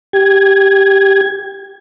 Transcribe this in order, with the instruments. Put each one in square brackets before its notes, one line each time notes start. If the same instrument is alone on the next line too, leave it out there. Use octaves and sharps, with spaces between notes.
[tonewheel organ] G4 G#6